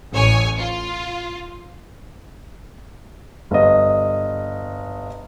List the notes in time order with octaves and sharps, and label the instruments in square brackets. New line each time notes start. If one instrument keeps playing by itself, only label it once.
[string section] A1 C#5 G#5
F4
[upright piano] G1 D#5